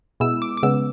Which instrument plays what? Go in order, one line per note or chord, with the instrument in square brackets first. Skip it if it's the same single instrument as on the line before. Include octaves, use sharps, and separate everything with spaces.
[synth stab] B2 G#3 B3 E4 E6
D6
D6
C#3 G#3 B3 E6